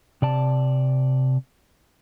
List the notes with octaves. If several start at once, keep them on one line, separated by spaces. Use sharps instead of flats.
C3 D5 A5